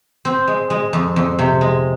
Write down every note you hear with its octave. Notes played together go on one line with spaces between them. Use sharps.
C4
G#3
G#3
F2
F2
C3
G#3